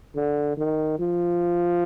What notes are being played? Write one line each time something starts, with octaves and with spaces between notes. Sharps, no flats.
D3
D#3
F3